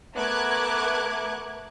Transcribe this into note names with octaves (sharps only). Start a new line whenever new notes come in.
A3 B3 A#4 D6 F#6 G#6